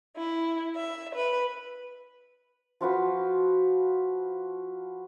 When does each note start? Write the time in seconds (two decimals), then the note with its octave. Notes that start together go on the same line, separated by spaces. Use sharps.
0.17 E4
0.76 E5
1.15 B4
2.81 F3 F4 F#4 B4